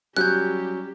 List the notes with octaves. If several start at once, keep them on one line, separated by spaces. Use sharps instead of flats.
F#3 G3 C#4 G4 F#6 G6